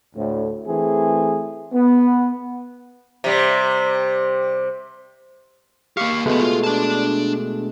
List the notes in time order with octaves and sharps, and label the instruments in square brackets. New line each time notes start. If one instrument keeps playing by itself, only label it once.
[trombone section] D2 A2
E3 A3 C4 G#4
B3
[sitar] C3 G3
[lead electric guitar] A#3 G4 [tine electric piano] F5 C#6
[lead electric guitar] C#2 B3 [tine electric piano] B2 G#3 A3
[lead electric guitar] F4
D4 A5